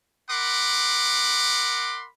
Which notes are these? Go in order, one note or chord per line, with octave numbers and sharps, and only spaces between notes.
A#4 F#5 B5 C6 D6